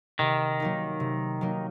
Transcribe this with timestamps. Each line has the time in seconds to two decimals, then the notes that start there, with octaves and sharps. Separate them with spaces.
0.19 C3 D#3
0.60 F#3 A#3 D#4
1.00 C3
1.41 F#3 A#3 D#4